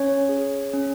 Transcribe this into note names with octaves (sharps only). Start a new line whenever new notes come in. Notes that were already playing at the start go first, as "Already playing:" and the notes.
Already playing: C#4 C#5
G#4
C#4